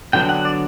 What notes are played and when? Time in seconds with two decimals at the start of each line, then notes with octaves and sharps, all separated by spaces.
0.13 D3 F#3 B3 D4 G5
0.29 F#5
0.45 D5